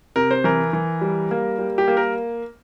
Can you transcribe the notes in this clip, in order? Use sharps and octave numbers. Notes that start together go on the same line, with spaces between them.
C3 A#4
C5
E3 A#4
E3
G3
A#3
G3
G4
A#3
A#4